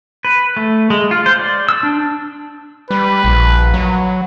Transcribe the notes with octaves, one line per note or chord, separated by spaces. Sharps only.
B4
A3
G#3
F4
C5
D5
E6
D4
G3 B4
A#1
F#3